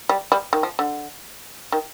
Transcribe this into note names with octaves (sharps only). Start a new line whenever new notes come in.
G3
G3
D#3
F3
D3
D#3